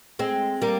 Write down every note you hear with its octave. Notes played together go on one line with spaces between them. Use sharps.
G#3 C4
G3 A#3